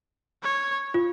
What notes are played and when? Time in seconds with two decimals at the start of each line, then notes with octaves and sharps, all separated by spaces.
0.43 C#5
0.94 F4